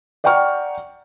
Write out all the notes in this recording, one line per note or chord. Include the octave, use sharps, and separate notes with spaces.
D5 F#5 G5 A#5 C#6 F6